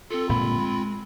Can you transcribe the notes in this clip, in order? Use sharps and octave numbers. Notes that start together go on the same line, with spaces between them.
C4 F4 A4
G1 A#2 G#3 B5
G#3